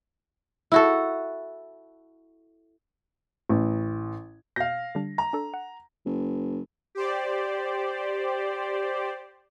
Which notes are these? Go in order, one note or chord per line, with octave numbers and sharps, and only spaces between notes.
E4 F#4 A4
A1
B2 F5 G6 A#6
D3 G3 D4
A#5
D4 A4
F#5
F#1
G4 C5 D5